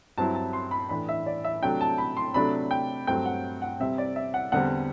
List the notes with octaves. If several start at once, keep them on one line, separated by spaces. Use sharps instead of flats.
G2 F#3 C4 E4 A5
A5
C6
B5
A2 E3 A3 D4 B5
E5
D5
E5
C3 F#3 A3 D4 G5
A5
B5
C6
C3 F#3 A3 D4 B5
G5
G2 F#3 A3 C4 G5
F#5
F#5
C3 G3 C4 E5
D5
E5
F#5
E2 D3 G3 C4 F#5